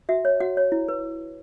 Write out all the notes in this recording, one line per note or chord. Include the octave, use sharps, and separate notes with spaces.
F#4 E5
C#5
F#4 F#5
C#5
E4
B4